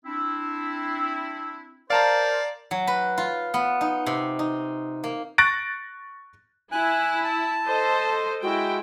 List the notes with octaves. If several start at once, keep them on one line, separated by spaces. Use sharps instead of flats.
C4 D4 E4
A#4 C5 D5 F5 A5 A#5
F#3
B4
F4
B3
D#4
C3
D#4
A#3
C#6 F#6 A6 A#6 D7
E4 G#5 F#6
A5
A4 C5 D#5
G#3 E4 F#4 G5